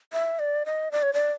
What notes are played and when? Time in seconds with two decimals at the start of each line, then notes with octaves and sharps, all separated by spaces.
0.13 E5
0.39 D5
0.66 D#5
0.92 D5
1.03 C#5
1.14 D5